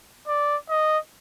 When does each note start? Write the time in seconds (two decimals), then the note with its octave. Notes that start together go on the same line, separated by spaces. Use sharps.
0.28 D5
0.69 D#5